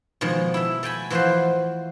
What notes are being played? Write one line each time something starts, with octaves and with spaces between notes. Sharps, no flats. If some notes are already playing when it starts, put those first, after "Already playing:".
B2 D#3 F3 G#3
E4 A4 E5
A3 G5 G#5 B5
E3 F3 F4 F#4 B4 C5